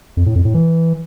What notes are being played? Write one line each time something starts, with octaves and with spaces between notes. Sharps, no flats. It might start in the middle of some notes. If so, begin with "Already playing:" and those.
F2
A2
F2
A2
E3